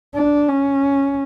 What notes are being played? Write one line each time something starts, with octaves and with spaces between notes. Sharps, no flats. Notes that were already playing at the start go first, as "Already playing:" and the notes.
D4
C#4